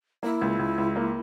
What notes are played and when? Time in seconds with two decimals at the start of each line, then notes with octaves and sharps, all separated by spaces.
0.23 A#3 E4
0.41 C#2
0.59 C#2
0.78 C#2
0.96 A#3